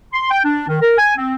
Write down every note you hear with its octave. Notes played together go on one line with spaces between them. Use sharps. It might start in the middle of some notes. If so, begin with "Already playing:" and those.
C6
G5
D4
D#3
A#4
G#5
C4